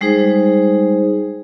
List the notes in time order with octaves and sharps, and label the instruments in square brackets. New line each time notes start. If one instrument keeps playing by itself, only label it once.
[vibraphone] G3 G#3 D#4 G#4 C5